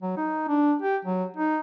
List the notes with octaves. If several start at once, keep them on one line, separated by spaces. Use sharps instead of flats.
F#3
D#4
D4
G4
F#3
D#4